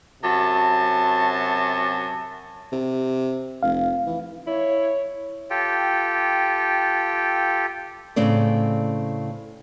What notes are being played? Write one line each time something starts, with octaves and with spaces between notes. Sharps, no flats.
F#2 C3 F#4 A5
C3
F1 F5
E3
E4 C#5
F4 G4 A4 G5
A2 C#3 C4 D5